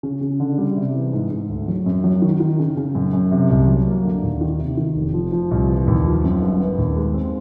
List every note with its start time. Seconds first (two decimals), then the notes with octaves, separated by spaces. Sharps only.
0.03 C#3
0.21 C#3
0.40 D3
0.58 G3
0.77 C3
0.95 E3
1.13 G#2
1.31 G#2
1.50 D2
1.68 F#3
1.86 F#2
2.04 F#3
2.22 D#3
2.40 D#3
2.59 C#3
2.77 C#3
2.95 F#2
3.13 F#2
3.31 C3
3.50 C2
3.67 F#3
3.87 A#3
4.04 D3
4.23 D#2
4.41 D#3
4.59 C3
4.77 D#3
4.96 F1
5.14 F3
5.32 F3
5.51 C2
5.69 E3
5.87 D#2
6.06 F3
6.24 F#2
6.41 G1
6.60 B3
6.78 D#2
6.96 G#3
7.14 C4